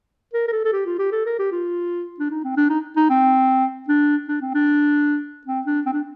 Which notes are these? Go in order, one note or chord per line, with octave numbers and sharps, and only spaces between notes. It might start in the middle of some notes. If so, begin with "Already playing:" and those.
A#4
A#4
A4
A4
G4
F4
G4
A4
A#4
G4
F4
D4
D#4
C4
D4
D#4
D#4
C4
D4
D4
C4
D4
C4
D4
C4
D4